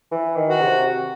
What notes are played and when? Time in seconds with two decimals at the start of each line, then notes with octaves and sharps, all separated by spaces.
0.12 E3
0.36 D#3
0.48 F#4
0.61 C3